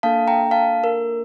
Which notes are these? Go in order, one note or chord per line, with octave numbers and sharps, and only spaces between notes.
A#3 D4 A4 F5 A5
G5 A#5
F5 A5
A#4